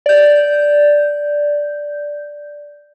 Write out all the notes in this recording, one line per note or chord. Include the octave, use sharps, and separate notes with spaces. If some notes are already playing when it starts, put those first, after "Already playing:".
D5 G6